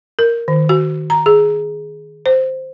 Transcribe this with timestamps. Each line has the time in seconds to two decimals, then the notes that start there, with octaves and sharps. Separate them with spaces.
0.19 A#4
0.48 D#3
0.69 F#4
1.10 A#5
1.26 G#4
2.26 C5